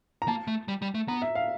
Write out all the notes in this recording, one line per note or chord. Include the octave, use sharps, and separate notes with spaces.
A#5
A#3 A5
A3
G3
G3
A3
B3 A#5
E5
F5